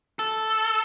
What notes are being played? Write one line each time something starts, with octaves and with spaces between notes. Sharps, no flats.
A4